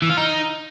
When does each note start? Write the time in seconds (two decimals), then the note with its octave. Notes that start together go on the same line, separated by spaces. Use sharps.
0.02 E3
0.10 F4
0.17 D#4